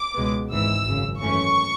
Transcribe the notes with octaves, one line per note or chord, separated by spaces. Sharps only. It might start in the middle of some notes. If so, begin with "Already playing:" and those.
Already playing: D6
C#2 B2 G#3 B3
G#1 G#2 E3 E6
G#1 F#2 C#3
F#2 E3 A3 C#4 C#6